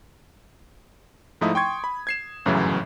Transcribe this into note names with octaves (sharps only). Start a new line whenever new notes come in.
G#2 F3 A3 D#4 E4 D#6
G5 C6 C#6 G#6
B5
G#6 C7 E7
G1 F#2 A2 C#3 E3 F#3